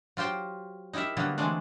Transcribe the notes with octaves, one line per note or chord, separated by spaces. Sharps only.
F#3 F4 G4 C5 G5
D#4 E4 G4 A#4 E5
D3 F#3 G3 A#3 B3
E3 G#3 A3 C4 D4